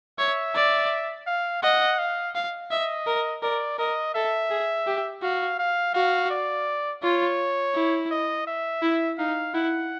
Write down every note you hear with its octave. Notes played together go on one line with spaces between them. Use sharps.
C#5 E5
D5
F5
D#5 F#5
F5
F5
D#5 E5
A#4
A#4 D5
A#4 D#5
A4 E5
G#4
G4
F#4 F5
F5
F#4 F5
D5
F4 C#5
E4
D#5
E5
E4
D#4 F5
E4 F#5